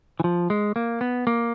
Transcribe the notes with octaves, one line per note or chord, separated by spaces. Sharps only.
E3
F3
G#3
A#3
B3
A#3